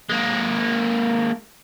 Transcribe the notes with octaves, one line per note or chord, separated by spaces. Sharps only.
G#3 A#3